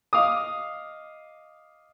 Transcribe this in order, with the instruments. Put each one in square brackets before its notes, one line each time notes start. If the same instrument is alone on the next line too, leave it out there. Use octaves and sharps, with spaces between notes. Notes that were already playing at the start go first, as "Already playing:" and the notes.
[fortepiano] D#5 F5 D6 D#6